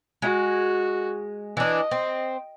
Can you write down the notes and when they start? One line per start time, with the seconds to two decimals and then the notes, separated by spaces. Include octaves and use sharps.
0.22 G#3 F#4
1.57 E3 D4 D#5
1.91 C4